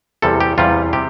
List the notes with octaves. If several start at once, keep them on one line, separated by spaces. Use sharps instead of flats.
E2 C3 G3 A4
G4
E2 C3 G3 F4
C3 G4